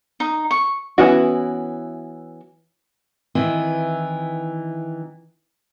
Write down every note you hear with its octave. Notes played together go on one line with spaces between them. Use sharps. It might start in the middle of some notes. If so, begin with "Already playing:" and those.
D#4
C#6
E3 B3 C#4 E4 F#4
D#3 E3 C4 E4